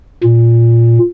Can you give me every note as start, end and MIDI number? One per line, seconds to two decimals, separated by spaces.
0.23 0.99 46